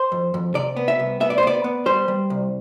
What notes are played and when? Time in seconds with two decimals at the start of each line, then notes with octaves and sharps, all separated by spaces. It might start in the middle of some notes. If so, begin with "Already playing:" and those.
Already playing: C5
0.12 F2
0.34 F2
0.55 C3 D5
0.76 B3
0.88 E5
1.00 C2
1.20 B3 E5
1.30 D5
1.38 C5
1.43 B3 D5
1.64 B3
1.86 G3 C5
2.08 G3
2.30 C2